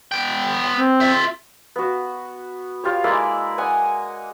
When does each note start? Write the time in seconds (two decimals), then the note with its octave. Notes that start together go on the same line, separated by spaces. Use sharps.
0.12 B3 G5
0.75 C4
1.01 F4 E5
1.76 B3 F#4
2.84 F4 G4 C#5
3.04 G#3 A#3 E4 D5
3.58 F#5 G#5 D#6